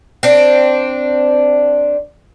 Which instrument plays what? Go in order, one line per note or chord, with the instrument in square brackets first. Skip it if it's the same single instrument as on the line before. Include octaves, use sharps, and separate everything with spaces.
[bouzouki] C4 D4